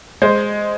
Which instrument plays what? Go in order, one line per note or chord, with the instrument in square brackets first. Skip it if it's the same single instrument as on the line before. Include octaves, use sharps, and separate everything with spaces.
[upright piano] G#3 [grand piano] C5